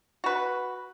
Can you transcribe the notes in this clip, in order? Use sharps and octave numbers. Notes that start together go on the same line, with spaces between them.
F#4 B4